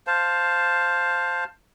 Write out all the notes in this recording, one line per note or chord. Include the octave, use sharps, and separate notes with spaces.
C5 F5 A5